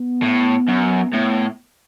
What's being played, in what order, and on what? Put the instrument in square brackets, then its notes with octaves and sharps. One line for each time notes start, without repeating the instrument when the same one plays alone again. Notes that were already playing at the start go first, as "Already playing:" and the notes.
Already playing: [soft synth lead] B3
[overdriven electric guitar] A2
F#2
[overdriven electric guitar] A2 [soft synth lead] B3